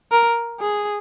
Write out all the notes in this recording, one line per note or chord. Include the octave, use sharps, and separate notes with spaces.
A#4
G#4